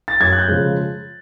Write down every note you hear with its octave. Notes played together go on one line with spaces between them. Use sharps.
A6
F#2 G#6
F#6
G6
C#3 F3 G#3